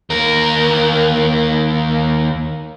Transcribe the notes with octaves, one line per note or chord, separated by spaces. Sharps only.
D#2 A#4